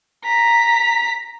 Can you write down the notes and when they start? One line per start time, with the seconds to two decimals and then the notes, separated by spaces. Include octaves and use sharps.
0.25 A#5 B6